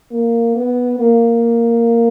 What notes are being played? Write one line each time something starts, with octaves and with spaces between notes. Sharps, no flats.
A#3
B3
A#3